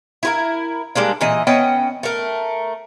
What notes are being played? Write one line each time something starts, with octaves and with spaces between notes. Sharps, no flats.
E4 F4 A#4
G3 G#3 A#3 D4
A#2 E3 D#5
B3 C#4 D#5 G5
A3 A#4